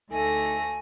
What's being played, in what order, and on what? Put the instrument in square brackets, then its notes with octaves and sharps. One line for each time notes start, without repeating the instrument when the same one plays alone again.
[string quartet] D2 A3 A#6 [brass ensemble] D#4 A4 [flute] G#5